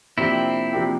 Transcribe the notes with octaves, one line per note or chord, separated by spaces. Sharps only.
C3 F3 A#3 C4 D4 E4 G4
C3 F3 A#3 D4 G4